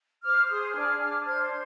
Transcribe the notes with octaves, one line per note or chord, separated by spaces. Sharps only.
C5 D6 F6
G#4 C6 D#6
D4 D6 F6
D4 D6 F6
C5 F6 G#6